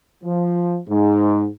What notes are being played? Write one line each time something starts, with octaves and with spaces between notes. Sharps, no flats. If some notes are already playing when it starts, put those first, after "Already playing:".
F3
G#2